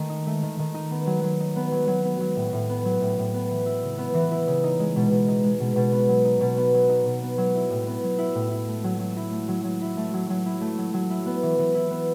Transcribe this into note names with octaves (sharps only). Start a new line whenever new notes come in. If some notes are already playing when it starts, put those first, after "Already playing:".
Already playing: D#3 A3
D#4
A3
D#3
D#3
D#4
B3
F#3
F#3
D#4
B3
F#3
F#3
B3
F#3
A2
A2
B3
F#3
A2
A2
B3
E3
E4
C#3
B3
E3
E4
C#3
D#4
G#3
B2
B2
D#4
G#3
B2
B2
B3
F#3
D#4
B2
B3
F#3
D#4
B2
B3
F#3
E4
A2
B3
F#3
E4
A2
E4
A3
F#3
F#3
E4
A3
F#3
F#3
E4
A3
F#3
F#3
E4
A3
F#3
F#3
E4
B3
E3
E3
E4
B3